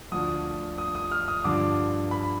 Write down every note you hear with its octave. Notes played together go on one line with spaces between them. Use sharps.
D2 D3 F3 D#6
D#6
D#6
F6
D#6
G2 D3 F3 D6
B5